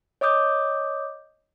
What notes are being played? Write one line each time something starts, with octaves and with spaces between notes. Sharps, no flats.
C#5 D#5 D6 D#6 G6